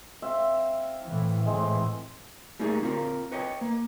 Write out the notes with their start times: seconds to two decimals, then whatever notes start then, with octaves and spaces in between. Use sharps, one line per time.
0.22 C4 E5 F5
1.05 A2 E3
1.46 A2 E3 G#3 C4
2.59 G3 A3 A#3 D#4 G#4
2.83 C4 F4 A#4
3.32 B4 C#5 D#5 G5
3.61 A#3